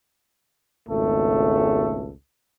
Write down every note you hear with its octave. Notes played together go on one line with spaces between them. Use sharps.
G#1 C#2 B2 A3 A4